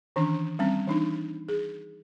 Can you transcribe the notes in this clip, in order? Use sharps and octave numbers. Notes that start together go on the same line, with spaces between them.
D#3 E3 C#4 D4
G3 C4 C#4
E3 D4 D#4
G#4